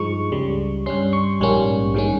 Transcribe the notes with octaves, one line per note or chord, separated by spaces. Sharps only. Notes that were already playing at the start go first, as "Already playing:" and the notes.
Already playing: G2 F3 G#3 D#4 C#6
C#2 C#3 G3
G2 G3 C#4 C6
C#6
A#1 G#2 G3 A#3 C#4
G2 D#3 G#3 C#4